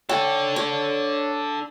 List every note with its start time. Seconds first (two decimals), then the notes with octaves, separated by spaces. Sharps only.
0.09 D4 A4 C#5 G5
0.56 C#5